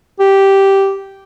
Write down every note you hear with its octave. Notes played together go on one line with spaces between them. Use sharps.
G4